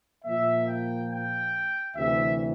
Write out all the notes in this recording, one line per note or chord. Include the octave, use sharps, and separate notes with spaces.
A#2 F3 A#3 E5
G5
G5
D2 C3 E3 E5